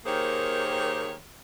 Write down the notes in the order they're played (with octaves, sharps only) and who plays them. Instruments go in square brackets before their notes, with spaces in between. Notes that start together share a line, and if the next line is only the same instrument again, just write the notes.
[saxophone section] D#3 A#3 G4 G#4 C5 C#5